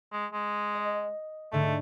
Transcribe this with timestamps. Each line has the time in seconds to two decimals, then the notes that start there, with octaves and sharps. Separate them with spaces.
0.12 G#3
0.33 G#3
0.75 D#5
1.52 G#2 D3 A3